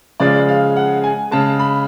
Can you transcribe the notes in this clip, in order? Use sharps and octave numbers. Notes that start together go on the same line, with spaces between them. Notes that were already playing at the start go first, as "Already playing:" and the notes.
C#3 F3 G#3 D5
F5
F#5
G#5
C#3 G#3 A5
B5